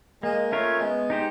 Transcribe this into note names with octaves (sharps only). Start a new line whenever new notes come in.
G#3 A#3
A3 C#4 F4 A#4 C#5
G#3 B3
D#4 G4 C5